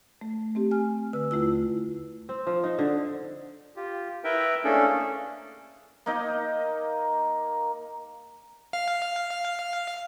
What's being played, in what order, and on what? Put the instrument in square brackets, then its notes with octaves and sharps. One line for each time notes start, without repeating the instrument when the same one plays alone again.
[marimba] A3
A3 C4 G4
G#5 F6
D3 B4 E6
D#2 A3 E4 F4 E6
[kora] C4
F3
D#4
D3
[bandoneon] F4 G4
E4 A#4 B4 E5 G5
A3 A#3 C#4 D4 G#4 A4
[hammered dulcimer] A#3 D#4 D#5
[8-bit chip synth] F5